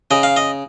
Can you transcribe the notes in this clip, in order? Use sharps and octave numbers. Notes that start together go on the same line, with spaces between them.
C#3 D#5
F5
D#5